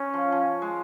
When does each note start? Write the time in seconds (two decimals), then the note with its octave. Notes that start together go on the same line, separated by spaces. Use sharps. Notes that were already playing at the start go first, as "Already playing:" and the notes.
Already playing: C#4
0.14 F3
0.32 F3
0.62 G#3